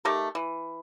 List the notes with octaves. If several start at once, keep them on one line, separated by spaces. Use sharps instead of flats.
A3 D#4 G4 A#4
E3